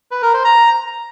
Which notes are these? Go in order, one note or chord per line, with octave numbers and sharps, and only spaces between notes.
B4
A#4
C5
A#5